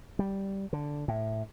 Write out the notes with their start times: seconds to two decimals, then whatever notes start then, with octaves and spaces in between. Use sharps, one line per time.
0.19 G3
0.73 D3
1.08 A2